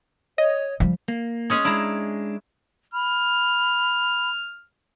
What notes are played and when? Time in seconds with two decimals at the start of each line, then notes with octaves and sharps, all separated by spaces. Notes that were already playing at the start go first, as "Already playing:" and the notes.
0.38 C#5 D#5
0.80 F3 G3
1.08 A#3
1.50 G#3 C#4 G#4
1.65 G#3 D4 E4 A#5
2.94 B5 F6